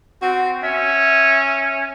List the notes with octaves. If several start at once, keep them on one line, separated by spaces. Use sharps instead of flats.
C4 F#4
C#4 E5